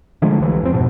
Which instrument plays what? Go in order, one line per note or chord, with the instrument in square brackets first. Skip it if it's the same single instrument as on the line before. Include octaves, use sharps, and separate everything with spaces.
[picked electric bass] D3 F3 G#3 A3
C2 E3
F1 F2 C4
F2 G#2 B2 F3